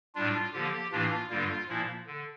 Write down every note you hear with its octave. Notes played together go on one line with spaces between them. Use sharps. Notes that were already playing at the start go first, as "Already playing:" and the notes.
A2 G3 D4 F4
D3 F3 A#3 G4
A2 E3 A#3 D4 F4
G2 D3 G3 A#3 F4
A#2 F3 A#3 E4
D3